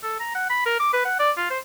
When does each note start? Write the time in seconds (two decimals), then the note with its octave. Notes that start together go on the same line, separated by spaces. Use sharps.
0.03 A4
0.20 A#5
0.35 F#5
0.50 B5
0.66 A#4
0.80 D6
0.93 B4
1.05 F#5
1.19 D5
1.37 F4
1.50 C5